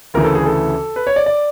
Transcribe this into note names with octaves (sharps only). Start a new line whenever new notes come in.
D2 C#3 E3 A#4
A4
G#4
A4
B4
C#5
D5
D5